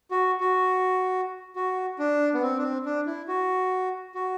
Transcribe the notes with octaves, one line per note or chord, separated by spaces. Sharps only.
F#4
F#4
F#4
D4
B3
C4
D4
C4
D4
E4
F#4
F#4